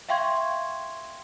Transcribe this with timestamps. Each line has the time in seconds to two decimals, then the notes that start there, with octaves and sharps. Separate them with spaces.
0.09 E5 F5 G5 C6 C#6 G#6